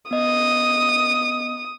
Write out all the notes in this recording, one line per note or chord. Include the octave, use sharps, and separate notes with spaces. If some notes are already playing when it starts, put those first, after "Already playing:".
B3 D#5 D#6